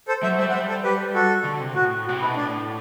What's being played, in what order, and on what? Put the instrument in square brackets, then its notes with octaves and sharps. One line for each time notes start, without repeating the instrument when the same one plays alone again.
[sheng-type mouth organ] A4 C5
[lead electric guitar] F#3 [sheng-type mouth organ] C5 E5
[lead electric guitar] G3 [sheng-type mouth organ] C5 E5
[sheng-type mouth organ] F#5
[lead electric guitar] G3 [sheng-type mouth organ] C5 E5
[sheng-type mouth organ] A4 C5
G4 B4
F#4 A4
[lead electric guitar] D3
C3
[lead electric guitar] A2 [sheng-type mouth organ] F#4
[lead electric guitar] C3 [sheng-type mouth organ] F#4
[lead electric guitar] B2 [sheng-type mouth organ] E4
[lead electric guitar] A2 [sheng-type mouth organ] D4